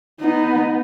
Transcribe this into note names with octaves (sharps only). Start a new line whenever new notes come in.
B3 D#4